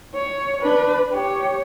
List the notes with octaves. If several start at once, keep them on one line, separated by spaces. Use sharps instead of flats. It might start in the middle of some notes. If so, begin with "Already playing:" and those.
C#5
D4 B4
G4 C#5